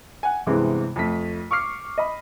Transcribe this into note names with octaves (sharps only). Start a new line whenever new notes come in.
F#5 G#5
G2 C3 E3 G#3 B3 C4
F2 A3 B6
C#6 D6 F6 C7
D#5 B5